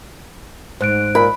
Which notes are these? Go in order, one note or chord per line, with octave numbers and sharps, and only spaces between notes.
G#2 C5 F#6 D7
A#2 B5